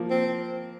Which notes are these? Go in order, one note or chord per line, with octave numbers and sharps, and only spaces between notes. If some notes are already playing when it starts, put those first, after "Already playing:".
Already playing: F3 A#3
C4